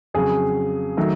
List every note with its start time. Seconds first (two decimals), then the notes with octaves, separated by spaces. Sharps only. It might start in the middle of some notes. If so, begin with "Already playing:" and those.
0.14 F2 C#3 F#3 G#4
0.97 D#3 F#3 A3